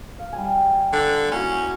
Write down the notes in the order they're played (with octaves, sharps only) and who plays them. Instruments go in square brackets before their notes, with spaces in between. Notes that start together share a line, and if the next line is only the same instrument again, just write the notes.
[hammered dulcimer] F5
G3 G#5
[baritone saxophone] D3
[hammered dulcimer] A#3 E4 F#4 [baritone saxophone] C#4